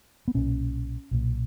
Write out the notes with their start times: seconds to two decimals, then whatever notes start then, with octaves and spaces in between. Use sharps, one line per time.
0.28 B3
0.34 B1 A#2 C#4
1.11 B1 A#2